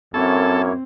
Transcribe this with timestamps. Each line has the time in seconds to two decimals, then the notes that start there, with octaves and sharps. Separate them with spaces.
0.14 F#2 A#3 C4 E4 A4 C#5